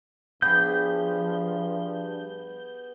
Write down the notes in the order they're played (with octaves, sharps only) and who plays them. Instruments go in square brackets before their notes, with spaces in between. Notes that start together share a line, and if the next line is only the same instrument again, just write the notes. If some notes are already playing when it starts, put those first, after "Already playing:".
[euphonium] G2 [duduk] F3 [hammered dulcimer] B3 G4 G#4 [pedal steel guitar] G6